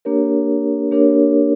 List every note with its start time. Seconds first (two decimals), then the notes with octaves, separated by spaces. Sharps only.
0.05 A#3 D4 G4 A#4 C#5
0.91 A#3 D4 G4 A#4 C#5